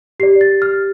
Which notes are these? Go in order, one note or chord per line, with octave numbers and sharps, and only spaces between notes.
G4 D5 C7
A6
F6